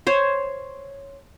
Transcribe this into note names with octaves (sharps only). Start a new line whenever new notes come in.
C5 C#5